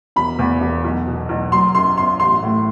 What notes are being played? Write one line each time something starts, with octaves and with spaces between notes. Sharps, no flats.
E1 B5
E2
E1
B1
B2
B1
F#3 C6
F#2 C6
G1 C6
A1 C6
A2